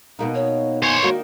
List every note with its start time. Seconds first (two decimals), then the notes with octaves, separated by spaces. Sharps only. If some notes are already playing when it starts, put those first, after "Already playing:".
0.19 B2 A#3 D#4
0.35 C#5
0.83 C5 C#5 G#5
1.03 D#3 A#3 D4 F#4